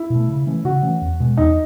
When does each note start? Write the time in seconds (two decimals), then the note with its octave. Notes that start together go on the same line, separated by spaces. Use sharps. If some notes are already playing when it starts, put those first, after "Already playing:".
Already playing: E4
0.10 B2 A3
0.29 C#3
0.47 E3 A3 C#4
0.65 C#3 F#4
0.83 E3 A3 C#4
1.02 E2
1.20 B2 G#3
1.37 E2 D#4